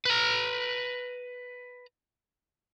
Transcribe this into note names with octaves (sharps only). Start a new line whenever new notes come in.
B4 A#5